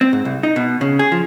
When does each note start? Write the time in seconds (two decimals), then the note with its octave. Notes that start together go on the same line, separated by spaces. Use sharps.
0.01 C4
0.13 G#2
0.25 C2
0.43 D#4
0.56 B2
0.81 C#3
0.99 G#4
1.12 F3